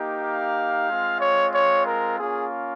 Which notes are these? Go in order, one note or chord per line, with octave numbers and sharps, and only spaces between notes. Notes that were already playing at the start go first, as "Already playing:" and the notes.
Already playing: A#3 D#4 G4
F5
G#3 C4 F4
C#5
C#5
A#4
A#3 C#4 F4 G#4